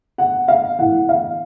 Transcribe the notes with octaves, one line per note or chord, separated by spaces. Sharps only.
F#5
F5
A2 E3 F#5
F5